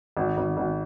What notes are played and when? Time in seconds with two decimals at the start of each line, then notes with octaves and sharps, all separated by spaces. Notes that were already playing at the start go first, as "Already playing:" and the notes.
0.17 G#1
0.37 G#1
0.57 G#1